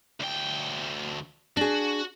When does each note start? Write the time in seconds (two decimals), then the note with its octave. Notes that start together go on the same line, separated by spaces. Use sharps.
0.20 D2 G5
1.57 D4 F#4 G#4